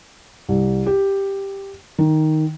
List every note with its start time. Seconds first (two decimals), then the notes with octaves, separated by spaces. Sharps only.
0.48 C2
0.86 G4
1.98 D#3